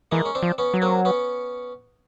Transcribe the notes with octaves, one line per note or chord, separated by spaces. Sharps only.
E3 G#3 A#3
C#4
C4 D4
F3
B3 C#4
F#3
A#3 C4
B3 C#4